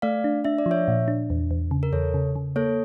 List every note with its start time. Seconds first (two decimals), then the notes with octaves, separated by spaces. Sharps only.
0.02 A3 D5 F5
0.24 D4
0.45 D4 E5
0.58 D5
0.66 F3
0.71 C#5 E5
0.88 A#2
1.08 D4
1.30 E2
1.51 E2
1.71 C#3
1.83 A#4
1.93 E2 A4 C#5
2.14 C#3
2.36 C#3
2.56 A#3 A4 C#5